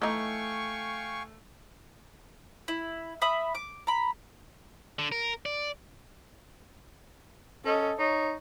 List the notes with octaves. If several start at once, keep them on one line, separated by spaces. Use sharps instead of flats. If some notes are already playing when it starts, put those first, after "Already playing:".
E3 A3 D#4 F5 G5 G#5 C#6
E4
E5 B5 D#6
D6
A#5 B5
D3
A#4
D5
C#4 A4 D#5
D#4 C#5